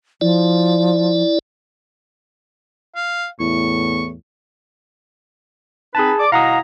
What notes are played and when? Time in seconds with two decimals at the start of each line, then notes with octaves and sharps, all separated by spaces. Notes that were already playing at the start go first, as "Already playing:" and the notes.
0.21 F3 E4 D5
2.96 F5
3.40 E2 A2 C#6
5.95 C4 D#4 G#4 B4 A5
6.19 D5 D6
6.32 B2 E4 F5 F#5 A#5 D#6